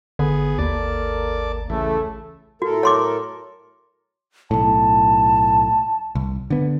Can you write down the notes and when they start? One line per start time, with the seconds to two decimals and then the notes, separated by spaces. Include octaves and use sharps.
0.19 G#1 D3 B3 G#4
0.58 D#2 A#3 A4 A#4 D5 A5
1.70 A1 C#3 E3 A3
2.62 A2 F#4 A4 A#4
2.83 C#5 C6 D6
4.51 B1 A2 A5
6.15 C2
6.50 D3 B3